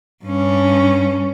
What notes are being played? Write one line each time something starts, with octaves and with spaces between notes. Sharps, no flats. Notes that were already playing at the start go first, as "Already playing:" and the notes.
G2 C#4